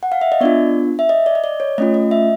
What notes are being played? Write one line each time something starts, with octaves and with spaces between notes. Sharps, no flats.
F#5
F5
E5
D#5
B3 D4 F4 D5
E5
D#5
D5
D#5
D5
C#5
A3 C#4 F4 D#5
D#5
E5